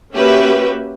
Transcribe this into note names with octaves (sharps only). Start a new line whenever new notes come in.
A#3 C#4 F#4 G4 B4 E5